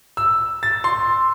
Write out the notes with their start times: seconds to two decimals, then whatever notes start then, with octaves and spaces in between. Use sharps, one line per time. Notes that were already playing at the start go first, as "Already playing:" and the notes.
0.17 E6
0.63 A6
0.84 C6